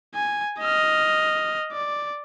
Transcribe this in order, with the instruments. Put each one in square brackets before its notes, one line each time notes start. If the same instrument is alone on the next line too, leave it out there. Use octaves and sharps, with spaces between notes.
[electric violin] G#5
D#5 F6
D5